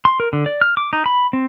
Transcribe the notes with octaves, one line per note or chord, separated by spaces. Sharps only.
C6
A#4
D3
D5
F6
D6
D#4
B5
C4